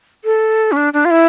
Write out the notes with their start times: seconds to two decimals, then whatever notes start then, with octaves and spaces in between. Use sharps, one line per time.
0.25 A4
0.72 C#4
0.77 D4
0.93 D4
1.05 F4
1.11 E4